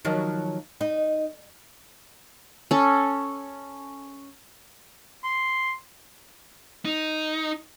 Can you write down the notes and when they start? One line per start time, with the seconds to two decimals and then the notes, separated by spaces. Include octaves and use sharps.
0.05 D#3 F3 F#3
0.81 D#4
2.71 C#4 A4
5.23 C6
6.85 D#4